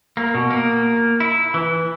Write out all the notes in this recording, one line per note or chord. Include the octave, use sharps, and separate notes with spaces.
A#3
B2
A#3
E4
E3